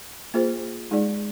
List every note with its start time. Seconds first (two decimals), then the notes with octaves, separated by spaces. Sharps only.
0.34 A#3 F4 G#4 C5
0.91 G#3 D#4 G#4 D5